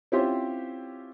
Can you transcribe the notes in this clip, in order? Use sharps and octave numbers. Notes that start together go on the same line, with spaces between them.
C4 C#4 E4 F4 G4 C5